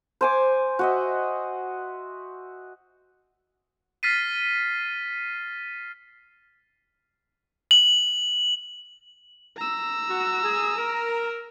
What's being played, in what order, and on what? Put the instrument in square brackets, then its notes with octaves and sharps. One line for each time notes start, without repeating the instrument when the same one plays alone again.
[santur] C5 G#5 D6
F#4 D#5 E5
[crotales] F6 A6 B6 C7 D#7
F#7
[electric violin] A#5 E6
[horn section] F#4
G#4
A#4